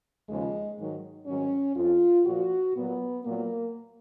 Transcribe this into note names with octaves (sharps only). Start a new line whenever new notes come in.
D#2 C#3 F3 G#3
G#2 D#3 F#3
G#2 D#3 F#3 C#4
F2 F3 F4
A#2 F3 F#4
A#2 F#3 B3
A#2 F#3 A#3